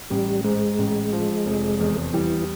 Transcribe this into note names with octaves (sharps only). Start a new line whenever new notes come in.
A1 G3
G#2 G#3
A1
F3
F1
E2
E3 G3